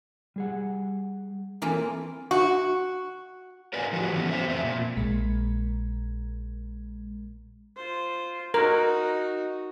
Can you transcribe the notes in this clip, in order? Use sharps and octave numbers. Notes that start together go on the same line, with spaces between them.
G3 G#4 F#5
E3 A#3 C4 F4 A4 G#5
F#4
A#4 B4 D5 F5 G#5
F3 A3 F#4 G4
E3 A3 B3 C#4 E4
C5 E5
F2 A3 C4 E5
A#2
A#1 A#2 G#3
F4 C5
D#4 F#4 A#4